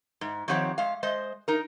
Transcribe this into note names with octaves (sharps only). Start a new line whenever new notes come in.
G#2
D#3 F3 C4 G4 C#5 F#5
G#3 F5
G#3 C5 D#5
D#4 A#4